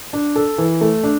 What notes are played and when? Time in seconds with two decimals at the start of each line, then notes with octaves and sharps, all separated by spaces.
0.13 D4
0.36 A4
0.58 E3
0.81 A3
1.03 D4